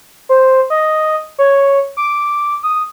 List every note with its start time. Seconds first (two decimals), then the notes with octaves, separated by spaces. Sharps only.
0.29 C5
0.70 D#5
1.39 C#5
1.97 D6
2.63 D#6